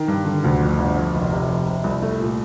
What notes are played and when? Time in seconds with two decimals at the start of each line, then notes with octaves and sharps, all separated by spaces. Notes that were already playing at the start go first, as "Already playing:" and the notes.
Already playing: D#3
0.08 G2
0.26 D3
0.44 D2
0.60 F2
0.78 G1
0.97 F2
1.15 F1
1.32 C3
1.49 F2
1.66 C3
1.84 C2
2.02 A3
2.20 A#2